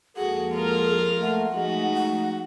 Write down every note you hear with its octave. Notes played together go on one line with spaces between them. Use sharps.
F2 G#3 A#3 F#4 G#4 A4
F4 A#4
A3 F#5
F3 G#3 A3 D#4 F#4
F#5